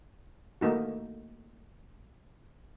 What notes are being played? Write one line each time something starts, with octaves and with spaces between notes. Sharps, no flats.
A3 A#3 D#4 F#4